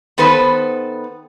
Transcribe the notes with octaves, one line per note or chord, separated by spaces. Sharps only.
D#3 B3 A4 B4 C5